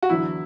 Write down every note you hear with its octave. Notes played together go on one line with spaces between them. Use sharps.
F#4
E2 D3 F#3 E4